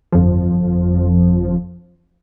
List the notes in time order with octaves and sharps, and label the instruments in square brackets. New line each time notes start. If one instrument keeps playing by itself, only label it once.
[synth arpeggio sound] G1 F2 F3